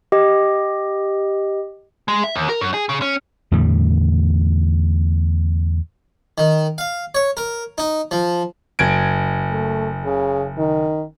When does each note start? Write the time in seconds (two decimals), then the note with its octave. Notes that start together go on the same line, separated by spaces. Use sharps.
0.12 G4 D#5
2.08 G#3
2.24 E5
2.36 D#2
2.49 A#4
2.61 F#2
2.74 G#4
2.89 C#3
3.02 C#4
3.52 E2 A2 D3 G3
6.38 D#3
6.78 F5
7.15 C#5
7.37 A#4
7.78 D#4
8.11 F3
8.79 F#1 G#6 D7
9.51 A3
10.05 C#3
10.58 D#3